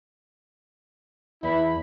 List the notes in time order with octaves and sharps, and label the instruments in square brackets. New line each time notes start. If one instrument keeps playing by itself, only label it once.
[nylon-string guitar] E2 [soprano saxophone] E4 [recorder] B5